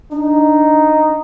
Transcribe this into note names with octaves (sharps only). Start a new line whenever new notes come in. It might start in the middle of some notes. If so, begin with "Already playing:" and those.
D4 D#4